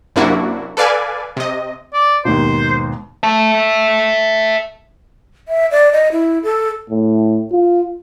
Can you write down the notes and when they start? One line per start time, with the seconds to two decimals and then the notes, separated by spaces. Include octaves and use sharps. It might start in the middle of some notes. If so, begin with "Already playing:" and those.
0.16 F#2 C3 A#3 D4 E4 F#4
0.77 A4 B4 D5 F5 G#5
1.37 C3 D#5
1.94 D5
2.25 D#2 G#2 B2 C5
3.23 E5 A5
5.48 E5
5.71 D5
5.93 D#5
6.12 E4
6.43 A4
6.90 A2
7.52 F4